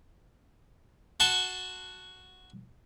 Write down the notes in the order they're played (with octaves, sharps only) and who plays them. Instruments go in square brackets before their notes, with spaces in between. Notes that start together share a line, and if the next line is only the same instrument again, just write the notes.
[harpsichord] F#4 A5 C6 C#6